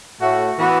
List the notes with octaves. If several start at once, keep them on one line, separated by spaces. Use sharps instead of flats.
A2 A3 F#4
E3 B3 F#4